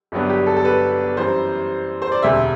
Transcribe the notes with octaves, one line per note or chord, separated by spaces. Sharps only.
G1 G2 F#3 B3 D4
G4
A4
A4
B4
F#2 E3 G3 C5
C5
D5
E1 D2 C3 E5